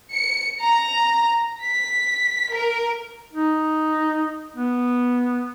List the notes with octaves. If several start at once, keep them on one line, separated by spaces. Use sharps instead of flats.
C#7
A#5
B6
A#4
D#4
B3